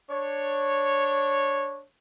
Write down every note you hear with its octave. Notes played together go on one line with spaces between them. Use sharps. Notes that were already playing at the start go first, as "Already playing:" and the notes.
D4 C#5